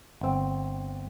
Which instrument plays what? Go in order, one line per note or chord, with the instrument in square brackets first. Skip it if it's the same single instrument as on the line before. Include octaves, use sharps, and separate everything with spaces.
[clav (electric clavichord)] G1 C4